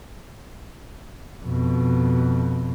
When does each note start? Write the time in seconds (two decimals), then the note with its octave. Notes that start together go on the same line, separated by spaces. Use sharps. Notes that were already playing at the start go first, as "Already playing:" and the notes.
1.44 F2 B2